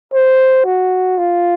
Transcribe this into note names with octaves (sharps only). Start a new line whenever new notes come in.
C5
F#4
F4